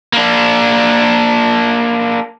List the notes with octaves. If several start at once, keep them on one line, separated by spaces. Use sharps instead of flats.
A#3 D4